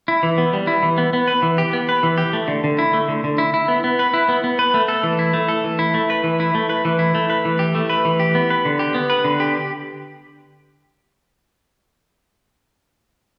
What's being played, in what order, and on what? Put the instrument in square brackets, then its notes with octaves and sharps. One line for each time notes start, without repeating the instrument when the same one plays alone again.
[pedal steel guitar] E4
E3
B3
G3
E4
E3
B3
B3
B4
E3
G4
B3
B4
E3
G4
A3
D3
D3
E4
A3
D3
D3
E4
E4
B3
B3
B4
E4
B3
B3
B4
A3
A4
E3
E4
A3
A4
E3
E4
A3
B4
E3
E4
A3
B4
E3
E4
A3
B4
E3
G4
A3
B4
E3
G4
B3
B4
D3
G4
B3
B4
D3
G4